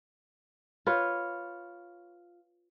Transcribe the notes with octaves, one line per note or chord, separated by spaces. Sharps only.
F4 B4 C#5